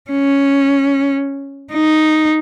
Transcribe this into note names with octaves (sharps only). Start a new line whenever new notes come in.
C#4
D#4